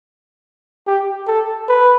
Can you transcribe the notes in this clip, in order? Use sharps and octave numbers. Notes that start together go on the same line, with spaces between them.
G4
A4
B4